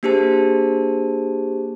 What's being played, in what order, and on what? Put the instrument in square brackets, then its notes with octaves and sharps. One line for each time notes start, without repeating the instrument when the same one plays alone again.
[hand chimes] A#3 D4 G4 G#4 C5 A5